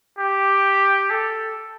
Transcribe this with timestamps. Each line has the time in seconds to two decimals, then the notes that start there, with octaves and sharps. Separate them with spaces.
0.18 G4
1.10 A4